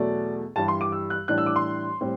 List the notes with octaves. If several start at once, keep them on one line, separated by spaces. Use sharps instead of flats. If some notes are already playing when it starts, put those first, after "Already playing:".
Already playing: E2 B2 F#3 A3 D5
G2 E3 G3 A5
C6
D6
E6
F#6
A2 E3 G3 D4 F#6
E6
D6
C6
A2 G3 C4